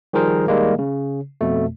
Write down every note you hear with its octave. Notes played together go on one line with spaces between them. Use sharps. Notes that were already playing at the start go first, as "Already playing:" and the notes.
D#3 F3 G3 G#4 A#4 C5
D#3 G3 G#3 A#3
C#3
F2 B2 A3